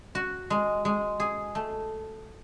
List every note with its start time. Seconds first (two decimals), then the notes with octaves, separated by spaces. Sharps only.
0.15 F#4
0.50 G#3
0.85 G#3
1.20 G#4
1.55 A3